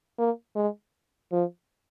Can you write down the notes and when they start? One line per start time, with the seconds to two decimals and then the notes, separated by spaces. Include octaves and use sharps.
0.19 A#3
0.56 G#3
1.32 F3